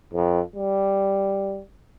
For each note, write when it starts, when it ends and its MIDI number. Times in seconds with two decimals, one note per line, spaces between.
0.13 0.41 41
0.56 1.62 55